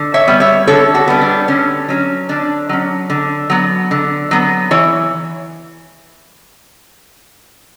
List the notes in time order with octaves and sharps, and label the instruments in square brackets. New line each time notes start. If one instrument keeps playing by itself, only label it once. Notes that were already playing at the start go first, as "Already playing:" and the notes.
Already playing: [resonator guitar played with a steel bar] D3
C#5 E5
G3 B3
C#5 E5
D3 A4 C#5
F#4 A4
G3 B3
D4
D3 C#4
F#3 C#4
D3 D4
F#3 C#4
D3
F#3 B3
D3
F#3 B3
E3 C#5